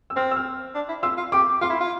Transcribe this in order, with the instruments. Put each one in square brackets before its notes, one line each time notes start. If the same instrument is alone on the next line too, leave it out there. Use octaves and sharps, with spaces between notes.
[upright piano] E6
[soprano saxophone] C4 [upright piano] F6
[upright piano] E6
F6
[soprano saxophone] D4
E4
[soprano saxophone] F4 [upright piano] E6
[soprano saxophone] F4
[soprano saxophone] G4 [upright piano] D6
[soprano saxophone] F4 [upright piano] C6
[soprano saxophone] E4
F4